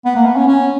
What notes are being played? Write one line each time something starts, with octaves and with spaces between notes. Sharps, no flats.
B3
A#3
B3
C#4
C#4